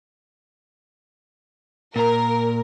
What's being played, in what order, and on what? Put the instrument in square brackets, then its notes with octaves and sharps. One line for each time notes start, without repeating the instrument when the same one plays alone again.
[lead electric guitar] A#2 A#5 [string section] A#4